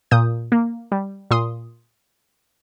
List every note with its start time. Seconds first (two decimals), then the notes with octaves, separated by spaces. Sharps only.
0.11 A#2 D#6 G6
0.52 A#3
0.92 G3
1.31 A#2 C6 D#6